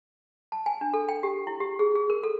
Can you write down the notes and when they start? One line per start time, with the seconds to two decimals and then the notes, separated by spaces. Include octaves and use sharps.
0.52 A5
0.66 G#5
0.81 D4
0.94 A4
1.09 G5
1.23 G4
1.47 E4
1.60 G4
1.79 G#4
1.95 G#4
2.10 A#4
2.23 A4